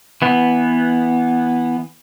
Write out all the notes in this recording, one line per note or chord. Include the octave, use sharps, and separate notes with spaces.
E3 B3